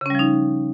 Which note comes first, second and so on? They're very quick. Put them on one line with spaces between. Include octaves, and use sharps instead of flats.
C#3 C#4 G3 F3 D#4